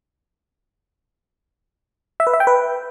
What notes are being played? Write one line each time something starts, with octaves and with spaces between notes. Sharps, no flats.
E5
B4
E5
G5
B4